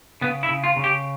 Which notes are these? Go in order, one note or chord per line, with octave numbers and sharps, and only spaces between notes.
C#3 B3
E4
C#3
F4
C#3
G4